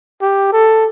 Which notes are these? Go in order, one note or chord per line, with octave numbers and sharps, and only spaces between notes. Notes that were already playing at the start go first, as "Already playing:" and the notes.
G4
A4